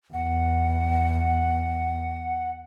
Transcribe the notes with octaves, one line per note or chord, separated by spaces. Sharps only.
E2 F#5